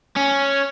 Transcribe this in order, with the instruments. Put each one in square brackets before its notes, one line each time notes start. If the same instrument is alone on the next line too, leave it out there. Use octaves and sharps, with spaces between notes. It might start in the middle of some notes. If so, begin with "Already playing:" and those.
[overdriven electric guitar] C#4